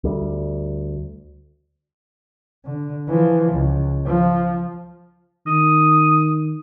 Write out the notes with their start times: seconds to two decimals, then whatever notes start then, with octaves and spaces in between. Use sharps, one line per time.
0.04 D2 G3
2.65 D3
3.08 E3 F3
3.53 C#2
4.06 F3
5.47 D#3 D#6